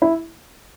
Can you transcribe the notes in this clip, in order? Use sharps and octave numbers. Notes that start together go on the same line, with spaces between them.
E4